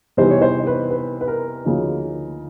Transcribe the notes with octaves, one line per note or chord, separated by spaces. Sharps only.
C3 E3 G3 B3 D#4 C5
C#5
C5
B4
B4
B4
A#4
D2 C#3 F3 A#3 D#4